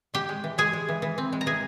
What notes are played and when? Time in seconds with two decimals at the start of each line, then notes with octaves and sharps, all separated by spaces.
0.14 G#3 G4 G5
0.29 G#3
0.44 E3
0.58 G#3 G#4 G#5
0.73 G#3
0.88 E3
1.02 E3
1.18 C4
1.33 G#3
1.41 A#5
1.46 E3 G#4 G#5